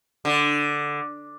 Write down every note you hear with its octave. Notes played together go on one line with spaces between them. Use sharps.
D3